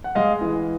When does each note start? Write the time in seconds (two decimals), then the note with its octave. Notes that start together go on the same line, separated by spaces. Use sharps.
0.04 F#5
0.15 G#3 D#5 F5
0.41 E3